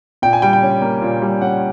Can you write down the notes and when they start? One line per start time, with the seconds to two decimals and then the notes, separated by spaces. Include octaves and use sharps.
0.22 A#2 G5
0.33 G#5
0.42 G3 G5
0.53 G5
0.62 C#4
0.82 A#3
1.02 A#2
1.22 G3
1.41 C#4 F#5